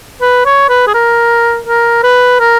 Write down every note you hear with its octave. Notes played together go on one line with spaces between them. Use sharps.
B4
C#5
B4
G#4
A#4
A#4
B4
A#4